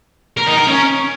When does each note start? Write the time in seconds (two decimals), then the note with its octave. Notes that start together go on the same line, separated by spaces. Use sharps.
0.37 A#4
0.47 D#4
0.57 A#4
0.67 C#4